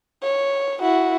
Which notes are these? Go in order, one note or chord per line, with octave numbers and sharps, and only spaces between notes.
C#5
E4 F#4